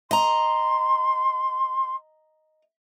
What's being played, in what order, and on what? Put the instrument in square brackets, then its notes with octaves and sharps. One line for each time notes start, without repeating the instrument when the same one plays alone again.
[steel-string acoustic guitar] D#5 A#5 [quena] C6